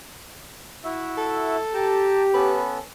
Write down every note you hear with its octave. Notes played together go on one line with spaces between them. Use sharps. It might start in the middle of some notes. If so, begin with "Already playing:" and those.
E4 F#4 E5
A4
G4 G5 A5 A#5
B3 C#4 A4 B4